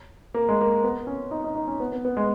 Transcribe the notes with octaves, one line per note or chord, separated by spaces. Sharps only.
A#3
G#3
A#3
B3
C#4
D#4
D#4
D#4
C#4
B3
B3
B3
G#3